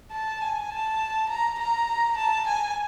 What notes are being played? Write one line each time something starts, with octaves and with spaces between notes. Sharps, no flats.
A5
G#5
A5
A#5
A#5
A5
G#5